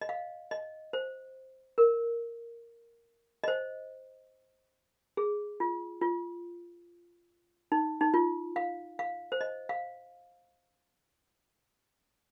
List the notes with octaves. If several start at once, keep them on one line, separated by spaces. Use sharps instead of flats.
D#5
F5
D#5
C5
A#4
D#5
C5
G#4
F4
F4
D#4
D#4
F4
F5
F5
C5
D#5
F5